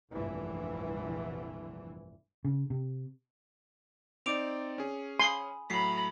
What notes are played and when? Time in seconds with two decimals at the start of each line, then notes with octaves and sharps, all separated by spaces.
0.12 F1 A#1 G2 E3
2.45 C#3
2.70 C3
4.26 C4 D#4 D5 D6 D7 F7
4.78 C#4 G#4
5.20 G#5 B5 C6 D#6
5.70 A2 F#3 A3 A#5 B5 B6 C7